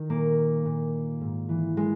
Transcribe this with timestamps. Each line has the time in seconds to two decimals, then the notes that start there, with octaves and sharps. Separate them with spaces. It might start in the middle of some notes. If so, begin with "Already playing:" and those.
Already playing: D#3 D#4
0.10 A#2 A#3
0.65 A#2
1.21 G#2
1.49 E3
1.77 G#3